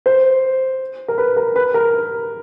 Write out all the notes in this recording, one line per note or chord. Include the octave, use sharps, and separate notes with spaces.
C5
A#4
B4
A#4
B4
A#4